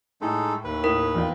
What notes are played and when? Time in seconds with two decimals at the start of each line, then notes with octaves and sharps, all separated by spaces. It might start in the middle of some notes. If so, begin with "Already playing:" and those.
0.21 A2 G#3 D#4 A4
0.64 D#2 B4
0.84 A2 A#4
1.15 E2 F4 G5